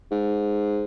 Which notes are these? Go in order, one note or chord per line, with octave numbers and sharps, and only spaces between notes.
G#2